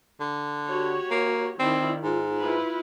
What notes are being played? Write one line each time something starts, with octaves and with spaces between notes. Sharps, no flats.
D3
F#4 G4 C#5
A#3
D#3 C4 E4 D5
G#2 F4
E4 F4 B4